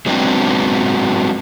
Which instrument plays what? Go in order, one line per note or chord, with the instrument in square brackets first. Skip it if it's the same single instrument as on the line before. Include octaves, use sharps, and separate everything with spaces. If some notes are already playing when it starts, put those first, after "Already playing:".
[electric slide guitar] F#3 G#3 B3 C4 D4